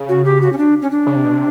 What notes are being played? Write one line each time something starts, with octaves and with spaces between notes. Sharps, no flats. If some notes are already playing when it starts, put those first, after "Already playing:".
Already playing: C#3
F#4
G4
F#4
C#4
D4
C#4
D4
C#3
C3
B2
C3